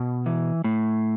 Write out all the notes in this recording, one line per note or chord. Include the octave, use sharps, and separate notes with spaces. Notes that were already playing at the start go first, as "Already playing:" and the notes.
Already playing: B2
E3
A2